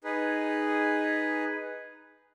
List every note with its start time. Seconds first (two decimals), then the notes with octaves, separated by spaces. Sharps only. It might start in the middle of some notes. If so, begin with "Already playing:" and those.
0.04 D#4 G#4 B4